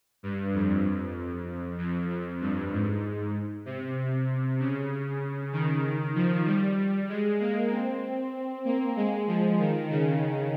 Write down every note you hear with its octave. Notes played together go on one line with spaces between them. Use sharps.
G2
F2
F2
F2
G2
G#2
C3
C#3
D#3
F3
G3
G#3
A#3
C4
A#3
G#3
F3
D#3
C#3